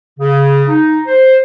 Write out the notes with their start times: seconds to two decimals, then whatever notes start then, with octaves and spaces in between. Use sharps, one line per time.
0.20 C#3
0.69 D#4
1.07 C5